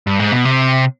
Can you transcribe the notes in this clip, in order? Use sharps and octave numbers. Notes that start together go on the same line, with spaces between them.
G2
G#2
B2
C3